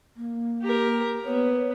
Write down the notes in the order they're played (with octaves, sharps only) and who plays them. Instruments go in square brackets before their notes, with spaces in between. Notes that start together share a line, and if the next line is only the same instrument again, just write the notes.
[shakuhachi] A#3
[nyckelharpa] G4 A#4
[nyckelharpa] B3 [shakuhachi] C#5